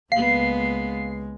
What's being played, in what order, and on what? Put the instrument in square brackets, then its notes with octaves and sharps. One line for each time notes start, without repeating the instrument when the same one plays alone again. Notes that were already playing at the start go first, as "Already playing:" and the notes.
[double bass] C#2 G#3 [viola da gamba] A#3 B3 [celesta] F5 [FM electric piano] C7